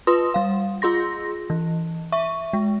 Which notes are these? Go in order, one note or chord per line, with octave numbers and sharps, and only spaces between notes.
F4 B4 C6 D#6
G3 F5
F4 G#4 C6 A#6
E3
E5 C#6
G#3